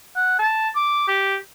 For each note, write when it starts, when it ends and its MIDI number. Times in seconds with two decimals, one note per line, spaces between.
0.16 0.38 78
0.39 0.69 81
0.76 1.06 86
1.08 1.36 67